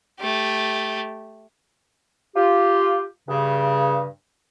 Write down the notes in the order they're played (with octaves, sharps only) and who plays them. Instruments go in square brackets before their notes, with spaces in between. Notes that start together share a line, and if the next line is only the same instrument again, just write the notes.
[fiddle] A3 G4
[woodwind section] F4 G4
G2 C#3